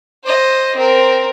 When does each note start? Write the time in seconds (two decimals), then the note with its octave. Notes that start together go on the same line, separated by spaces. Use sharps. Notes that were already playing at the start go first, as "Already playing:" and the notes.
0.25 C5 D#5
0.76 C4 A#4